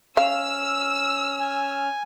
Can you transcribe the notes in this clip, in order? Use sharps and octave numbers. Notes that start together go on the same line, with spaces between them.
C#4 F5 E6 F6
G#5